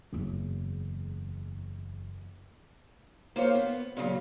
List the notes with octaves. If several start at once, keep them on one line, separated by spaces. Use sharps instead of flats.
F#1 E2
A#3 F4 C5 C#5
B3
A#2 C#3 E3 F#3